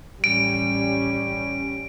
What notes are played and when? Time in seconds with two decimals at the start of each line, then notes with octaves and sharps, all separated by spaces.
0.24 A1 G3 C#4 D7